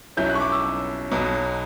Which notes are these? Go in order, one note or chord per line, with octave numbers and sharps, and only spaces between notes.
B1 B2 F#3 C#4 E4 G6
F#6
C#6
D6
E6
B1 B2 F#3